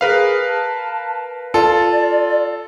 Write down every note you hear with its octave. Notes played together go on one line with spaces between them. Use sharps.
G#4 A#4 B4 F5
A5
F4 A4 D5